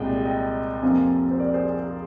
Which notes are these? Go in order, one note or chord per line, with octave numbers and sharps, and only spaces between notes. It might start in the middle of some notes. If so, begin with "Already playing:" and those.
Already playing: C2 A#2 G#3 D#5 G5
D#5 G5
F2 C3 F3 A#3 F5 G#5
C5
A#4 D5
G#4 C5
G#4
G#4